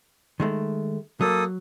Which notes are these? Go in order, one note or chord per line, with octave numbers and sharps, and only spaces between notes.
D#3 G#3 A3
F#3 A#3 A4 D#6